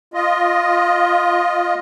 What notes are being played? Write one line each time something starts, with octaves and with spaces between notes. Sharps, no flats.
F4 D#5